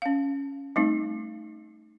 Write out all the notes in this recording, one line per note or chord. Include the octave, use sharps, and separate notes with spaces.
C#4 F5
G3 A3 C4 D#4